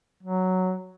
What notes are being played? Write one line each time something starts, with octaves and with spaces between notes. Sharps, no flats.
F#3